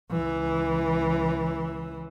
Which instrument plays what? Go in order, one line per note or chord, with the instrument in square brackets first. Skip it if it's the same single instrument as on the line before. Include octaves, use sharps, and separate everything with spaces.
[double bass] C#2 E3